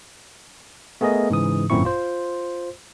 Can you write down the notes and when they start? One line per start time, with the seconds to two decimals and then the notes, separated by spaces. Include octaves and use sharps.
1.01 A3 B3 G#4 A#4 D#5
1.30 G#2 C#3 E3 D#6
1.70 G#1 F#2 A#2 C4 E4 C#6
1.85 F4 C5